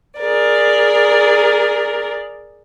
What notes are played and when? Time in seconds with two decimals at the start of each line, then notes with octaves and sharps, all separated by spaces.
0.20 G#4 A#4 D5